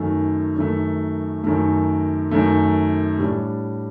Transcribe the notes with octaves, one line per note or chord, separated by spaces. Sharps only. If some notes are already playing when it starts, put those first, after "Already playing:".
Already playing: F#2 D#3 A3
F#2 D#3 A3
F#2 D#3 A3
F#2 D#3 A3
A2 G3 D4